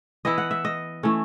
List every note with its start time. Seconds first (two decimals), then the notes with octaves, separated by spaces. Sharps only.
0.25 E3 B3 E4 D#5
0.38 F#5
0.51 E5
0.65 D#5
1.03 E3 A3 C#4